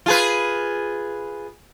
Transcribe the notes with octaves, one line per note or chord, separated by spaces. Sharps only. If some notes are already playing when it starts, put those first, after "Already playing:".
F4 G#4 B4